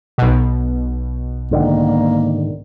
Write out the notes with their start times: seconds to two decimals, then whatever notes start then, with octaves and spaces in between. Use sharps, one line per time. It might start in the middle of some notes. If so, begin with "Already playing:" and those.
0.18 B1 B2
1.51 G#2 D3 D#3 A#3